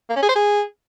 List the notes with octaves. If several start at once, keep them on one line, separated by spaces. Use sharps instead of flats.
A#3
C#4
G#4
C5
G#4